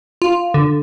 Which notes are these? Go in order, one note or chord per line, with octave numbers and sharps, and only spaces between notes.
F4
D3